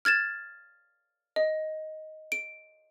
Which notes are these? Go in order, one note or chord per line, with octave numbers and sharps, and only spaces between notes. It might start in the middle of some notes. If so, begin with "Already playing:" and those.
F6 G#6 A6 E7
D#5
D7